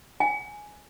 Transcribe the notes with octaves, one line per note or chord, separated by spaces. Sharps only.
G#5